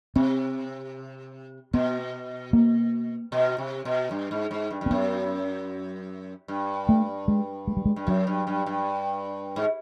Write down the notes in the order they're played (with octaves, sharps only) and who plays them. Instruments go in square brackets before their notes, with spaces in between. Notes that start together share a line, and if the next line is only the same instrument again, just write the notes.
[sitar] C3 [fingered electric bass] C4
[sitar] B2 [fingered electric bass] B3
[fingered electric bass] A#3
[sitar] B2
C3
B2
G2
G#2
G#2
G2
G2
[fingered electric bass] C4
[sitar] F#2 [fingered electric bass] B3
[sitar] G2
[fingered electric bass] A3
G#3
G#3
G3
G#3
[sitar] G2
[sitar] F#2 [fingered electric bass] F#3
[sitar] G2
G2
G2
G#2